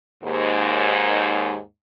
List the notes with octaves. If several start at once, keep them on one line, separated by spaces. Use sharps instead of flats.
D#2 G#2